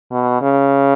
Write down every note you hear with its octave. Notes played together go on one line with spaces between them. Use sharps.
B2
C#3